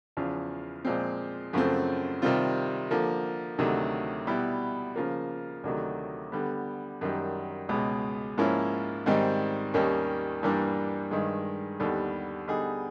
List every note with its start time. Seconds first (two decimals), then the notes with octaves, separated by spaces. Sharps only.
0.17 E2 C#3 F3
0.85 A#2 F3 G#3 C4
1.53 F#2 C#3 F3 A3 C4
2.22 C3 D#3 G3 C4 F4
2.91 D3 F3 A#3
3.59 D2 C3 D#3 F#3 A3
4.27 B2 G3 B3 E4
4.96 C#3 F3 A#3
5.64 D2 C3 D#3 F#3 A3
6.32 D3 G3 B3
7.01 F#2 D#3 G3
7.69 C#2 B2 G#3
8.38 G#2 F3 A#3 C#4 E4
9.06 G#2 D#3 G3 C4 D#4
9.74 D#2 D#3 G3 A#3 C#4
10.43 G2 E3 G3 A#3 D4
11.11 G2 D#3 G#3
11.79 D#2 D3 G3 B3
12.48 D3 G3 B3 D#4 G#4